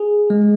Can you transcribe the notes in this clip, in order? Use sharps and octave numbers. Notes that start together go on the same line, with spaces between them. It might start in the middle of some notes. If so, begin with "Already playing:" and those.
Already playing: G#4
G#3